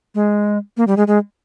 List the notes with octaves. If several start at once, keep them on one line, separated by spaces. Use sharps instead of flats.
G#3
A#3
G3
G#3
G#3